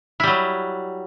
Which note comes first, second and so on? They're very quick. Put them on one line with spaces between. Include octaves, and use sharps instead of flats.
E4 G3 F#3